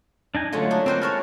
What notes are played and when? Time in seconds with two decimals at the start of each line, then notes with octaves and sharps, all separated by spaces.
0.35 D4 D#4 G#5
0.52 D3 F#3 G#3 A3 C#4 F4
0.71 D4 D#4
0.86 A#3 C4 F4 F#4 C5
1.01 G#3 E4 F#4 C#5 A5 F6